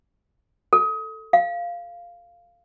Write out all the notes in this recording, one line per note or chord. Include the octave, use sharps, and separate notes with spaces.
A4
F5